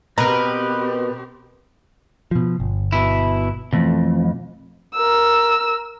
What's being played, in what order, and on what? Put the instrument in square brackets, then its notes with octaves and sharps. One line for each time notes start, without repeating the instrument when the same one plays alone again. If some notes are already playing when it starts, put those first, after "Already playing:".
[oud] B2 [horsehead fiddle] C4 G4 [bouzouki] A#4 B4 [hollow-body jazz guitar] A#5
[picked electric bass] B2 F3
G1
[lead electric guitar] B2 E4
[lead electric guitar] F2 [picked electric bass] B2 E3 A3
[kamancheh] A#4 E6